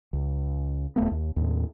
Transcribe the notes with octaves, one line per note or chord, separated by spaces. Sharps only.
C#2
D#1 E2 A3 B3
D#2
D#2 A2